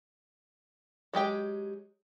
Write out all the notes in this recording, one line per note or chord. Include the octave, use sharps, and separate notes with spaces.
F#3 G#3 G4 G5